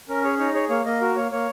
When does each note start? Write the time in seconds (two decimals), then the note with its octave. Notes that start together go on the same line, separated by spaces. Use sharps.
0.09 C#4 A#4
0.24 G#4 C#5
0.38 D#4 C#5
0.54 G#4 C#5
0.69 A#3 C#5
0.85 A#3 D#5
1.01 F#4 A#4
1.16 A#3 C#5
1.31 A#3 C#5